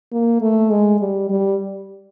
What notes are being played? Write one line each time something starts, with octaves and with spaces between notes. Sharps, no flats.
A#3
A3
G#3
G3
G3